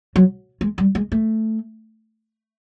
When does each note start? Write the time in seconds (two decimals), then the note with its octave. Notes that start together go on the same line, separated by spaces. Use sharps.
0.16 F#3
0.61 G#3
0.78 G3
0.95 G#3
1.12 A3